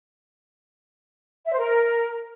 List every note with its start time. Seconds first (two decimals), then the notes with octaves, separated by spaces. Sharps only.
1.47 E5
1.53 C5
1.59 A#4